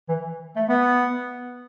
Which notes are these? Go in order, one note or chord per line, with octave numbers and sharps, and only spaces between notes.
E3
A3
B3